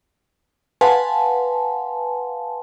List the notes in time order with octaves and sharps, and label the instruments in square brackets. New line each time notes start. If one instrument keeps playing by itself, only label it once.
[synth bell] B4 F5 F#5 G#5 A5 C6